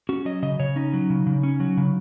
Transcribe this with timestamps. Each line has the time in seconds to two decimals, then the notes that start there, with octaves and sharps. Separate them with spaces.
0.09 C#4 F#4
0.25 F#3 D#5
0.42 C#3 D#5
0.60 C#3 C#5
0.76 C#4 D#4
0.93 F#3
1.10 C#3
1.27 C#3
1.43 C#4
1.60 F#3
1.77 C#3